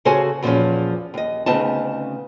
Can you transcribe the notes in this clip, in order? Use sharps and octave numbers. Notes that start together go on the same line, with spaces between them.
C#3 F#4 A4 C5 C#5 G#5
E2 A#2 D3 F3 C#4
D#2 D#5
D2 C#3 B3 C4 D#4 A5